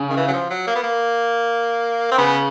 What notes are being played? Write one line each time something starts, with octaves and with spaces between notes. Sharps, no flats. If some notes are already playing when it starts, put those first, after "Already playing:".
Already playing: C#3
D#3
E3
F#3
F3
F#3
A#3
B3
A#3
C4
C#3 B3